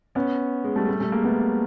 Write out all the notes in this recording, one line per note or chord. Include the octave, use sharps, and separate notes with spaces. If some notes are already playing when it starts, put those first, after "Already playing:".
B3 C#4
G#3
G3 A3
G3 A3
G3 A3
G#3 A#3
A3 B3